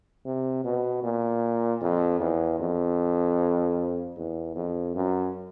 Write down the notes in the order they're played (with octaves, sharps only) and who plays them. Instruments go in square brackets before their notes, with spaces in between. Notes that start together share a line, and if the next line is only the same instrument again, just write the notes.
[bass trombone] C3
B2
A#2
F2
E2
F2
E2
F2
F#2